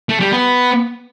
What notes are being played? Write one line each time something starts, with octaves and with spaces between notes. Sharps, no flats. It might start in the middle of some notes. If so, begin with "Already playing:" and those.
A3
G3
B3